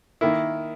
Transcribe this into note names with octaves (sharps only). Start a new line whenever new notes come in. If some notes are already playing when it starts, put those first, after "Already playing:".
D#3 A#3 E4